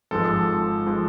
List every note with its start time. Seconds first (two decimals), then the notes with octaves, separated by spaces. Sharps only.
0.11 G#1 G#2 F3 G#3 A4
0.87 F3 G#3